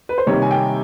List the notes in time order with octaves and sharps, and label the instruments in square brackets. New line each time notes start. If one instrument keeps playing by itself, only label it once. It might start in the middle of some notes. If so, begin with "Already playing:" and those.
[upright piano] B4
C5
C3 D#3 G3 A#3 C#5
G#5
G5